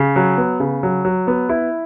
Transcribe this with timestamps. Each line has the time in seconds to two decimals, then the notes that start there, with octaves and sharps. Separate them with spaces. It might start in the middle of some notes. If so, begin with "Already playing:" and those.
Already playing: C#3
0.16 F#3
0.38 B3
0.60 C#3
0.83 F#3
1.05 F#3
1.27 B3
1.49 E4